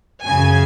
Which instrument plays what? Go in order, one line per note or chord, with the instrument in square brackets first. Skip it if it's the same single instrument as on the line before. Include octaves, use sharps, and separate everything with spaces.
[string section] F#2 C#3 G#5